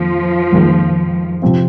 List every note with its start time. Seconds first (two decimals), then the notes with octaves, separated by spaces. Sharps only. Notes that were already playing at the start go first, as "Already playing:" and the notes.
Already playing: F2 D#3 F3 A#3
0.52 F2 D#3 A#3 F4 G#4
1.42 C3 F3 C4 F4